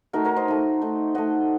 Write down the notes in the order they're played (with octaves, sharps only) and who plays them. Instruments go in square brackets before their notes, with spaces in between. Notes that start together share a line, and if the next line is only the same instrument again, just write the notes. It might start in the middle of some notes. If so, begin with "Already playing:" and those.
[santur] A3 D#4 F#4 A#4
A#4 C#5
C5 D#5
A3 D#4
A3 D#4
A3 D#4 D#5 F#5